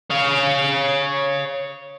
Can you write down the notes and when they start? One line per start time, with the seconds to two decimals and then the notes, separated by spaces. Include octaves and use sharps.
0.10 C#5 F5